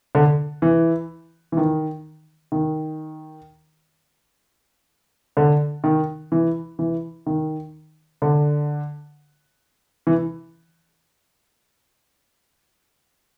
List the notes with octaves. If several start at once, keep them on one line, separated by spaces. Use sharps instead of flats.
D3
E3
E3
D#3
D#3
D3
D#3
E3
E3
D#3
D3
E3